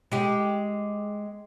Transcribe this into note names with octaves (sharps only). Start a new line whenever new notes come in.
G#3 G4